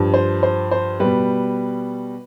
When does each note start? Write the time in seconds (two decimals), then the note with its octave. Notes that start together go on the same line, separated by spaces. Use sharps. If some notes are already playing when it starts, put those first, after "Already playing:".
Already playing: G2 F3
0.14 C5
0.43 C5
0.71 C5
1.00 B2 G3 B4